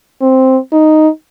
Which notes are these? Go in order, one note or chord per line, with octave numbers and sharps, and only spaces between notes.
C4
D#4